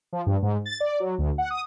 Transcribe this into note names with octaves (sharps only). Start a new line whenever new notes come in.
F3
G2
G#2
A6
D5
F#3
D2
F#5
D#6